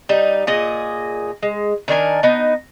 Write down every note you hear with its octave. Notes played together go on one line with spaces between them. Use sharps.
G3 D#4
A#2 G#4 D#5
G#3
D#3 D4 A#4 G#5
B3 D#4